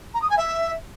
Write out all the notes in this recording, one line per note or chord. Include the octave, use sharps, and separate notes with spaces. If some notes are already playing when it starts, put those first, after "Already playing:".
A#5
D#6
G#5
E5